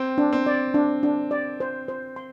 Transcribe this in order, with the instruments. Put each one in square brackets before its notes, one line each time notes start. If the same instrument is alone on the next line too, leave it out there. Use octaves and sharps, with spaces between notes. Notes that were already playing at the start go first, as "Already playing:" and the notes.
Already playing: [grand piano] C4 [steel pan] G5
[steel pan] D4
[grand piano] C4
[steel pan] D5
D4
D4
D5
C5
C5
C6